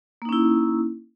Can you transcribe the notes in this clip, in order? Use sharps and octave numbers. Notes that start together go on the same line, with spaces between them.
A#3 C#4 D#4 E4